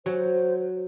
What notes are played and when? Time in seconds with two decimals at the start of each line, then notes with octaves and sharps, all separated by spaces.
0.06 F#3 C5